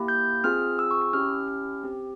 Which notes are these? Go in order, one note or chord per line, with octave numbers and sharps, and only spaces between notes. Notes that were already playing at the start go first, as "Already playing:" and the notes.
Already playing: A#3 E4 G4
G6
C4 F4 G#4 F6
E6
C#6
E6
C#4 E4 G4 F6
F6
C4 G4